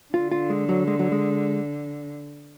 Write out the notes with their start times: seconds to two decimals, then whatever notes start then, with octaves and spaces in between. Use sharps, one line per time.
0.14 D3 F4
0.31 F4
0.50 G#3
0.69 F#3
0.87 G#3
0.99 F#3
1.12 G#3